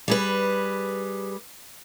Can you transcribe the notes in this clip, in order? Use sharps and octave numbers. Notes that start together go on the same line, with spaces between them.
G3 G#4 B4